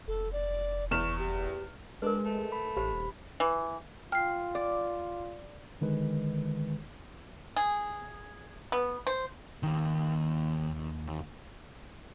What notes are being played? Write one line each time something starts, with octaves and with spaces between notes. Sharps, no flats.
F1 A4
D5
E2 C#6 F6 E7
G4
G#3 D4 A#4 B4
A3
B5
A1 G4 C5 B5
D#1
E3
F4 G5 F6 C7
D5
D3 D#3 G#3 B4
G#4
B3
C5
D#2 D#3